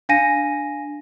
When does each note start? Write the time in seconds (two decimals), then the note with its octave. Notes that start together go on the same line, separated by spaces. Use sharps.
0.09 D4 F5 G#5 A#6 D#7